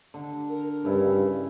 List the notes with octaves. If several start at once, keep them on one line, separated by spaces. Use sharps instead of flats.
D3
A#4
G2 C#3 E4 A4